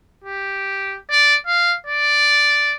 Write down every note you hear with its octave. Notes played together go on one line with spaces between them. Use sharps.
G4
D5
F5
D5